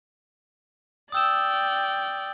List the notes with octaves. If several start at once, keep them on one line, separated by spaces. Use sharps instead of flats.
D5 G5 D#6 E6 E7